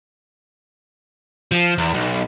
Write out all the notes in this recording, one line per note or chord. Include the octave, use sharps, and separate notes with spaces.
F3
E2
B1